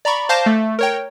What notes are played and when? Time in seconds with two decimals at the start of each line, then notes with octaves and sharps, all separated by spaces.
0.05 D5 A#5 B5 C#6
0.29 C5 F5 A5 D6 G6 A#6
0.46 A3
0.79 A#4 C#5 G5